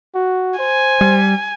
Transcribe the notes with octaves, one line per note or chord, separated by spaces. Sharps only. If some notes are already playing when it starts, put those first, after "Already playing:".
F#4
C5 G#5
G3